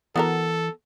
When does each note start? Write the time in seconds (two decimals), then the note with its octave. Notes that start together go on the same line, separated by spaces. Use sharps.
0.16 E3 B3 F#4 A4 A#4